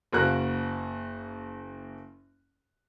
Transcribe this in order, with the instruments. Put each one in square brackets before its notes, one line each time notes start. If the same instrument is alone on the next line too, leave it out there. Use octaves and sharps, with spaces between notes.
[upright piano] F#1 A#3 F#4 A#5 F#6